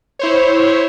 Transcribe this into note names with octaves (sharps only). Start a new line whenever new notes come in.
E4 C5 C#5